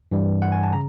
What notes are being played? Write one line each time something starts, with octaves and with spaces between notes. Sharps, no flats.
G2 E3 G3
F#5
G#5
A5
C#3 A#5